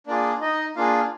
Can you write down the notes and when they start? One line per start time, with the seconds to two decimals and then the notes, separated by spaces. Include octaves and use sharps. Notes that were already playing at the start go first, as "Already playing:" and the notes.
0.07 A#3 D4 F4 G#4 D5
0.41 D#4 D#5
0.76 A#3 D4 F4 G#4 F5